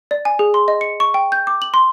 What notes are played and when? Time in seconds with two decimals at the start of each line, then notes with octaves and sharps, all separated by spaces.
0.11 D5
0.25 G#5
0.39 G#4
0.54 C6
0.68 D#5
0.81 C#7
1.00 C#6
1.14 G5
1.32 G6
1.47 D6
1.62 F#7
1.74 C6